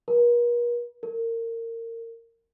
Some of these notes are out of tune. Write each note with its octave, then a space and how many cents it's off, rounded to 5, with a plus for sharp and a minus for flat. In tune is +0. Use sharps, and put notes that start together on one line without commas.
A#4 +45
A#4 -25